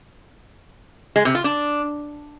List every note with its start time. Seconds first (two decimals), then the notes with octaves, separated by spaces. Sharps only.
1.16 G#3
1.25 C3
1.35 F4
1.44 D4